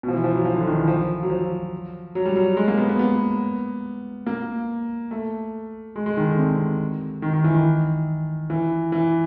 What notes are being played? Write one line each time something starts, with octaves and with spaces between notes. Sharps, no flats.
B2
F3
E3
F3
F#3
F3
D3
D#3
E3
F3
F#3
F3
F#3
G3
F#3
G#3
A#3
B3
B3
B3
A#3
A3
G#3
G#3
D#3
D3
C3
D#3
D#3
E3
D#3
E3
E3